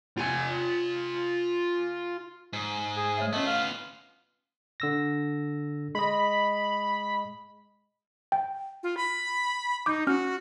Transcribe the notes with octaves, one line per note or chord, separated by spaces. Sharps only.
F4 G#5
G#2
G#4
A3 C#5 E5
A3 B3 C#4 F4 C#5 D#5
F5
D3 E6 A#6
G#3 D#5 B5
G5
F4
B5
D#4 D6 G6
C#4 F#4 F6